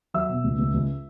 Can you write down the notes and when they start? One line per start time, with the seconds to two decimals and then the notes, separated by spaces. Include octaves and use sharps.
0.14 F#3 E5 E6
0.29 B2
0.44 C#2
0.59 C#2
0.74 C#2